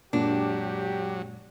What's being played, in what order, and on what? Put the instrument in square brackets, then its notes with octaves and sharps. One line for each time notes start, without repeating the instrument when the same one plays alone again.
[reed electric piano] F#2 A#2 G#3 [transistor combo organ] F#3 [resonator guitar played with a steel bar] D4 [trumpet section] G4